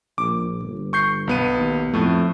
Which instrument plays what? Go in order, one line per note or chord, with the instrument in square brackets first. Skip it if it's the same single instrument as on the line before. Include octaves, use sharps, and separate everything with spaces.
[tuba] A#1 [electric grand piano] D6
[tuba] G1
[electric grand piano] C#6 G6 C7
B1 B3 D#7
[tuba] D#2
[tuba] F2 [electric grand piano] A2 A3